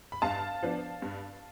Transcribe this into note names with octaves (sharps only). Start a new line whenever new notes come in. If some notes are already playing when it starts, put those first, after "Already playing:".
B5
G2 F5 A5
F3 B3 D4
G2